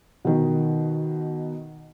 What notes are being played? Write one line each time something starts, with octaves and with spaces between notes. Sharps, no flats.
B2 D#3